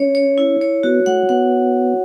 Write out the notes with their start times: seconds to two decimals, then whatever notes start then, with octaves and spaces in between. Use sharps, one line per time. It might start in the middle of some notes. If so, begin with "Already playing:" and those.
Already playing: C#4 C#5
0.15 C#5
0.38 E4
0.61 C#5
0.83 B3 F#4
1.06 A3 F#5
1.29 B3 F#5